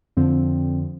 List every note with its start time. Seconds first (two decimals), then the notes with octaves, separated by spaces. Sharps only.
0.17 F2 D3 F3 C4